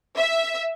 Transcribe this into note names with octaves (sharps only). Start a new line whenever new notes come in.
E5